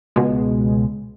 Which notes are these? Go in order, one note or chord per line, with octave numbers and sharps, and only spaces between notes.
C#2 B2 G#3